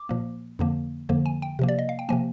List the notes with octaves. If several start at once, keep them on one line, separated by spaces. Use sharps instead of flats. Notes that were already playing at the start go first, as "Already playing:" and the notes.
Already playing: D6
A#2 F3 A#3
F2 D3 F3 A#3
F2 D3 F3 A#3
G#5
G5
C3 F3 A#3
D5
D#5
F5
G5
C3 F3 A#3 G#5